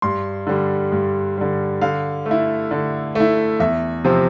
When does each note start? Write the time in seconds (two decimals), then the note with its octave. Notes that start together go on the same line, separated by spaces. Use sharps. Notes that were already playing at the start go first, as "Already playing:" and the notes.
0.02 G2 C6
0.47 D3 G3
0.92 G2
1.37 D3 G3
1.81 D3 F5
2.26 A3
2.31 E4
2.71 D3
3.15 A3 E4
3.60 E2 E5
4.05 C3 F3 C4